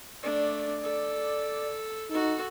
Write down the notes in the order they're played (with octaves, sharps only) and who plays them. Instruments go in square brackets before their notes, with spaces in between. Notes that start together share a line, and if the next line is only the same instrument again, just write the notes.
[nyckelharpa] A3 D4 [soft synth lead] D5
[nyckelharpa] A4
[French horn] D#4 [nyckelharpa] F#4 A4